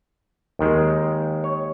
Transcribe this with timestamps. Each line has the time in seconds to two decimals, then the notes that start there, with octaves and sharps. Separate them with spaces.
0.59 D#2 D#3 G#3
1.44 C#5